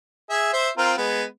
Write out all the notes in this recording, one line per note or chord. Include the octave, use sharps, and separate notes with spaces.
G#4 E5
C5 E5
C4 F4 A#4
G#3 B3